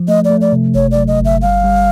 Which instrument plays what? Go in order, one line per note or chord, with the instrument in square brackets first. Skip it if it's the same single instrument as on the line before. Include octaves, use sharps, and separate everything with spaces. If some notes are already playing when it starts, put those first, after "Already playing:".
Already playing: [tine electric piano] F3
[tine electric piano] A3 [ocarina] D#5
[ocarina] D5
[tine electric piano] A3
[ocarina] D5
[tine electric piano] C3
[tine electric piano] G1 [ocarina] C#5
[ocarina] D5
[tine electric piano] F#3
[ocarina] D#5
[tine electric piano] G1
[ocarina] E5
[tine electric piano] G3 [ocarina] F5
[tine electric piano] G3